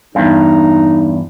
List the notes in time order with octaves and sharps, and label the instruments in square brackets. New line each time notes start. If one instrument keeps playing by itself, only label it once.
[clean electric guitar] E2 G2 [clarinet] D#4